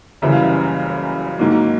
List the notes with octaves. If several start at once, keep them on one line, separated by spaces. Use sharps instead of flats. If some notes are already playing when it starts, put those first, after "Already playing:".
F#1 F#2 C#3 E3 G3 E5
F5
E5
G#2 D#3 F#3 A#3